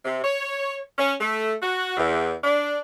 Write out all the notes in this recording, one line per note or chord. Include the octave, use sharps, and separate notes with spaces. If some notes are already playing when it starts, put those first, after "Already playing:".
C3
C#5
C#4
A3
F#4
E2
D4